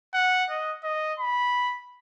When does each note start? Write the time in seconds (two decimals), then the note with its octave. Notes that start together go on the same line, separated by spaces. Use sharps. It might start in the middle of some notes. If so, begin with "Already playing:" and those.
0.14 F#5
0.50 D#5
0.84 D#5
1.19 B5